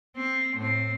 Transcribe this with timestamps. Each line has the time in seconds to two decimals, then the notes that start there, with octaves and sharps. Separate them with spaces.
0.16 C4
0.56 A2 C4